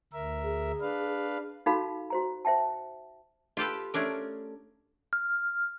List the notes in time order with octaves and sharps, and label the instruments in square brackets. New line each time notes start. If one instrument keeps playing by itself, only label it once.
[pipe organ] D2 A#4 E5
[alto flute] G#4
[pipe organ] D4 B4 F5
[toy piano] D#4 F#4 A4 F5 B5
F#4 C5 A#5
C5 E5 G5 A5
[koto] F4 G4 A4 B4
A3 C#4 D4 A#4
[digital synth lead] F6